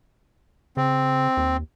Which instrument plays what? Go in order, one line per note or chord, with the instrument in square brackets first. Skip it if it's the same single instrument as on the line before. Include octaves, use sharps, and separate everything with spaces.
[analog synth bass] C#3 [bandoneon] C4
[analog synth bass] D#2